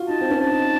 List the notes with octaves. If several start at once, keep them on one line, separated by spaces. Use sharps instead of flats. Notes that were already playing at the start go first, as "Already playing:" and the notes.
Already playing: F4 F#4
D#4 A5
C4
C#4
A5
D#4